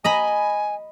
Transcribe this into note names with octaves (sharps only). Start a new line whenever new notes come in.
D#5 G#5 A#5 B5